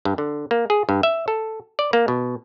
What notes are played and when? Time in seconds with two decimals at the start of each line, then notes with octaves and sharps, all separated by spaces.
0.05 G2
0.18 D3
0.51 A#3
0.70 G#4
0.89 G2
1.03 E5
1.28 A4
1.79 D5
1.93 A#3
2.08 B2